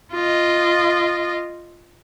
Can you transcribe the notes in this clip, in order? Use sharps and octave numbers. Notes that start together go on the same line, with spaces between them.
F4 D#5